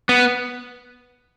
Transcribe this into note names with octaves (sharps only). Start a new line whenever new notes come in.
B3